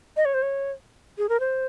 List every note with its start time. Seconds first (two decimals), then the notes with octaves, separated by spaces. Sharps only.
0.17 D#5
0.25 C#5
0.34 C5
0.42 C#5
1.18 G#4
1.29 A#4
1.40 C5